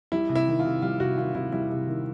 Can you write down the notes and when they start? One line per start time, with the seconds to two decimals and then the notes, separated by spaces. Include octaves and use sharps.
0.12 G3 E4
0.29 C3
0.35 E4
0.48 D#3
0.60 F4
0.65 C3
0.82 G3 F4
1.00 C3 F#4
1.18 D#3 F4
1.35 C3 E4
1.52 G3 E4
1.70 C3
1.87 D#3